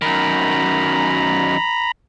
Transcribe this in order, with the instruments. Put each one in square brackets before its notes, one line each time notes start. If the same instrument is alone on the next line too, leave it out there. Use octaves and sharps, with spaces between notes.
[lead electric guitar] F#2 D#3 [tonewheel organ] A#5 B5